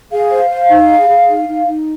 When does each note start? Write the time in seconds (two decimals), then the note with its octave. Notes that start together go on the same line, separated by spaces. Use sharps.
0.12 G#4 F5
0.31 C5
0.50 C5
0.70 D#4
0.90 G#4
1.08 G#4
1.28 D#4
1.48 D#4
1.67 D#4